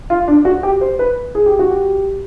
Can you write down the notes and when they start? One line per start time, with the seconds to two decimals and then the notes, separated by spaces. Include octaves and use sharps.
0.10 F4
0.28 D4
0.45 F#4
0.63 G4
0.81 C5
0.99 B4
1.35 G#4
1.46 G4
1.59 F#4
1.70 G4